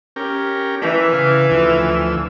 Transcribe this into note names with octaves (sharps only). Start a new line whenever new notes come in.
C#4 G4 A#4
E3
C#3 F5
D2 F3 E6